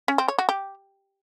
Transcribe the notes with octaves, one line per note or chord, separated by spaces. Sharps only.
C#4
C4
C#5
F#4
G4